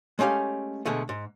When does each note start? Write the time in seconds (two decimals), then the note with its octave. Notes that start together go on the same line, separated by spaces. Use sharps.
0.19 G#3 A3 C#4 G4 F5
0.85 B2 D3 G#3 A3
1.09 G#2